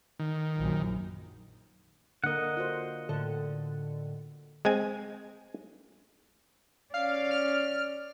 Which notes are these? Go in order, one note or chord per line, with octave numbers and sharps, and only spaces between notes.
D#3
A#1 F#2
D3 A#3 A#4 D#5 F#5
F4 F#4 C5
A2 D3 A4
G#3 C4 G#5
C#4 D5 F5
F6